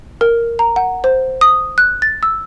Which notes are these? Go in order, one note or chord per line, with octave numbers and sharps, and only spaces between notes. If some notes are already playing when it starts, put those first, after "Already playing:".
A#4
A#5
F#5
C5
D#6
F#6
A6
E6